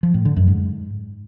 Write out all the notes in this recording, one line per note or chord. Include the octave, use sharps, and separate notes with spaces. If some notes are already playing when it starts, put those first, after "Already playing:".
F3
A2
D3
F#2
G#2